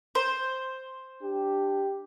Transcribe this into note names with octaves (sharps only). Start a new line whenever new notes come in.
C5
D4 G4